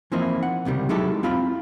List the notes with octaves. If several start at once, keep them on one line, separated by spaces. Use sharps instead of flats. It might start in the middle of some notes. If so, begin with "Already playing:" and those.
E3 F3 A#3 C4 D#4 E4
F#5
C#2 C3 D#3 G3
F#3 G#3 D#4 E4 G4 A4
C4 E4 F4 F5 B5